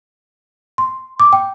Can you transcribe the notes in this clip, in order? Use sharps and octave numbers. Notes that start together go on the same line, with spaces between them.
C6
D6
G5